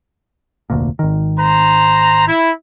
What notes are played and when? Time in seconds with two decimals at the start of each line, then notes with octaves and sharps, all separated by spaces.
0.70 F1 D2 A#2
0.99 G#1 D#3
1.39 C5 A#5
2.27 E4